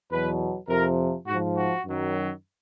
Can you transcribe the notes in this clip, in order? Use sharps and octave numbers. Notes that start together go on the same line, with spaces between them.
E2 B2 F#3 B4
F2 C3 F3 A#4
G#2 F3 F#4
F#4
F#2 D#3 F#3